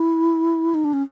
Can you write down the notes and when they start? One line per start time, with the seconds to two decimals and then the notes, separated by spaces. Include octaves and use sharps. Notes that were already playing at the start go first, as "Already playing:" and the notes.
Already playing: E4
0.74 D#4
0.85 D4
0.93 C#4